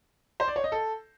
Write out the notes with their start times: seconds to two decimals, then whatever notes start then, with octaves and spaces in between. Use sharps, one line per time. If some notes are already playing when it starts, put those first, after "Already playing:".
0.40 C5
0.48 D5
0.56 C#5
0.64 D#5
0.72 A4